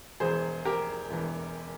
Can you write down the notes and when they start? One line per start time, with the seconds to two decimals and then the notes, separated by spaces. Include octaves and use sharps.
0.20 E1 E2 E3 G#4 C5
0.65 G4 A#4
1.11 E1 E2 E3